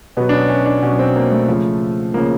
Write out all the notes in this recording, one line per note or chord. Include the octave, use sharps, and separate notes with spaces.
B2 F#3 B3
D4
C#4
C#4
D4
B2 F#3 C#4
C4
A#3
A3
C#3 F3
C#3 F3 A#3